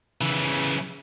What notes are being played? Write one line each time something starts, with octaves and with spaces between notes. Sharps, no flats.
C#3 E3